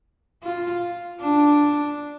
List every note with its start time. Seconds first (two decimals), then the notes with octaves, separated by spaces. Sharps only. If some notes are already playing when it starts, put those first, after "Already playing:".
0.43 F4
1.21 D4